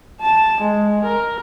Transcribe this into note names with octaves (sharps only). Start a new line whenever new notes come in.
A5
G#3
A#4